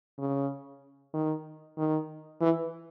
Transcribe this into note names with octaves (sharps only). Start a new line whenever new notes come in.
C#3
D#3
D#3
E3